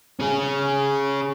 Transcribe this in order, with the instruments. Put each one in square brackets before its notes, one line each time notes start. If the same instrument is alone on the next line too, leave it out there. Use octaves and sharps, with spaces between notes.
[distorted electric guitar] C#4 G#4